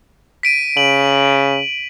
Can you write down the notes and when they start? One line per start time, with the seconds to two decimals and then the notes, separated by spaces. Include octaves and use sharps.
0.43 B6 D7 D#7
0.77 C#3 F#7